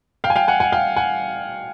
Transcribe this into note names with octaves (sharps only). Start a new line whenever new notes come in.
F5 G5
G#5
F5 G5
F#5 G#5
F#5 G#5
F5 G5
F#5 G#5